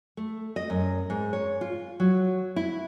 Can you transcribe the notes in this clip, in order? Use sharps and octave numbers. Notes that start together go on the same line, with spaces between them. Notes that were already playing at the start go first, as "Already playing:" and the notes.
A3
D#5
F#2
G#2
C#5
F4
F#3
E4